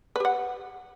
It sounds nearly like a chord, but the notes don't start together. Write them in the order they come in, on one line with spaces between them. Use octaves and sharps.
B4 G4 F#5